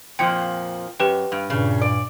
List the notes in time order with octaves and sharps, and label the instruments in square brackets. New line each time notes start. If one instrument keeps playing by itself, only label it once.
[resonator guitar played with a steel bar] F2 A#2 F3 [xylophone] G5 C#7
[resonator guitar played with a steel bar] F#2 [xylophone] G4 B4 G5
[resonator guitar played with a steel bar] G2
[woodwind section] G2 A#2 [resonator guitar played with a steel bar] C#3
[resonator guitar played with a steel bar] D5